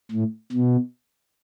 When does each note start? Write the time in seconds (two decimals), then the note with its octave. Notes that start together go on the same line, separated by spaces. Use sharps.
0.11 A2
0.52 B2